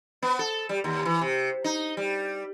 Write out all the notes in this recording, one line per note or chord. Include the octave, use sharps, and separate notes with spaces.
B3
A4
G3
D#2
E3
C3
D#4
G3